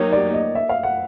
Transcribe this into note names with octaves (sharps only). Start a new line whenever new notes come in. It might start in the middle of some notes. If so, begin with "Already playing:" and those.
Already playing: F#3 A#3 D#4 G4 C#5
D5
D#5
E5
F5
F#5